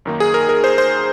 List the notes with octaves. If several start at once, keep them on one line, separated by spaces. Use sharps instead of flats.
F#2 D#3 A#3 D#4
G#4
A#4
A#4
C5
C5